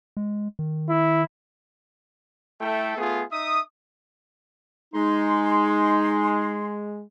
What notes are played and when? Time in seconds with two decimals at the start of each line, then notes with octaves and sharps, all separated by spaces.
0.17 G#3
0.59 D#3
0.89 E4
2.61 A3 E4 A4 E5 G5
2.97 A3 B3 F4 G#4
3.31 D#4 E5 D#6
4.94 G#3 D#4 C6